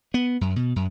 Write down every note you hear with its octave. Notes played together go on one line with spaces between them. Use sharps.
B3
F#2
B2
F#2